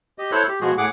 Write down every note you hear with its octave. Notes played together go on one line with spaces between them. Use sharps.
G4 D#5
E4 A4 C5 C#5 F#6
G4
B2 F3 G#3 F#4 G#4
A2 G#4 F#5 D6